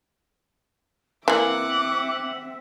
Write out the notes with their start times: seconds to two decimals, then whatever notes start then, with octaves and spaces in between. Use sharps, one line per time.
1.28 E3 A#3 C4 E5 F#5 D6